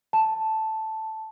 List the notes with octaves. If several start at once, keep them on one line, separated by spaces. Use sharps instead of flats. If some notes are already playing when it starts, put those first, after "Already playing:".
A5